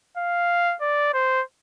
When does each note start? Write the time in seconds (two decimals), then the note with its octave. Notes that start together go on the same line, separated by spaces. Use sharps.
0.17 F5
0.81 D5
1.13 C5